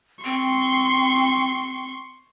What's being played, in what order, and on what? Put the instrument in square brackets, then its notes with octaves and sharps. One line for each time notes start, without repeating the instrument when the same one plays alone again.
[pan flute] C4 [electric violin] C6 C#6